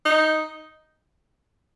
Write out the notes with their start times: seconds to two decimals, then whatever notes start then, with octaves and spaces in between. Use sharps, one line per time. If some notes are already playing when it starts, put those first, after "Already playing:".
0.05 D#4